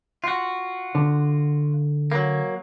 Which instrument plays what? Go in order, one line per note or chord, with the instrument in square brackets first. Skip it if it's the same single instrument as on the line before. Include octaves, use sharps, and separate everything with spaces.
[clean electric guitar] F4 F#4
[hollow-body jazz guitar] D3
[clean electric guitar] F#3 A#3